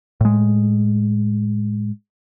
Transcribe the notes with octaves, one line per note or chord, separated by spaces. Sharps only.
A2 G#3